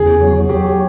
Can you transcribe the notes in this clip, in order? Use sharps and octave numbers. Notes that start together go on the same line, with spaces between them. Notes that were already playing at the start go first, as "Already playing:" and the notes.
Already playing: E2 C#3 G#4
F#3
F#3 G4